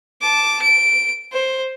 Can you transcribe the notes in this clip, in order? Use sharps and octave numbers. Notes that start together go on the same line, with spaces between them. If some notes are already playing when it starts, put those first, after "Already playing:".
A5 D6
D7
C5